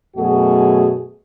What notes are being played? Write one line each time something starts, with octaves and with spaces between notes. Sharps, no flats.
F#2 B2 A3 F#4 G#4